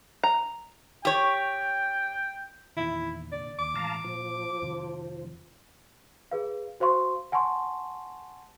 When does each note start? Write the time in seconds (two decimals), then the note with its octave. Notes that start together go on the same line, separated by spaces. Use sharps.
0.23 A#5
1.05 G4 C#5 G5
2.77 E2 A#2 D#3 E4
3.32 F1 A#2 D3 D5
3.59 D#2 D6
3.75 A2 E3 G#3 F5 A5 A#5
4.04 A#2 F3
4.62 F2 C3 D#3
6.31 G#4 B4 F5
6.80 F#4 C5 F5 C6 C#6
7.32 F#5 G#5 A5 C6 C#6